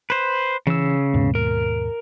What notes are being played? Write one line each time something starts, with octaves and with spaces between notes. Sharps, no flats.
B4 C5
C#3 E3 E6
D#2 G#2 B2
A#4